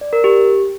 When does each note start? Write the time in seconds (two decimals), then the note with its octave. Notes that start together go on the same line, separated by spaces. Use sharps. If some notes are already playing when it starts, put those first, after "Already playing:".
0.01 D5
0.13 A#4
0.24 G4